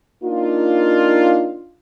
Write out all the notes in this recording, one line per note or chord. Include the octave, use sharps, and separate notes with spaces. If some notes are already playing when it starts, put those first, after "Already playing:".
A#3 D4 D#4 F4